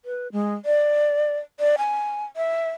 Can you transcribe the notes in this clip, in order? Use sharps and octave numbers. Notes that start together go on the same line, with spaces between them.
B4
G#3
D5
D5
G#5
E5